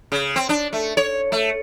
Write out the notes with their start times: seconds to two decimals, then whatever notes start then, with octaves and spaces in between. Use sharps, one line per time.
0.12 C#3
0.36 C4
0.49 D4
0.73 A3
0.97 C#5
1.32 A3